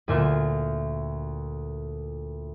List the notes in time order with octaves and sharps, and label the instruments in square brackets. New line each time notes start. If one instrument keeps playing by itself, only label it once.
[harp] D2 A#2 F4 E5